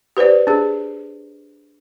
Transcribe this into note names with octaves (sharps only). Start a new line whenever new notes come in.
G4 B4 C5 D5
D4 G#4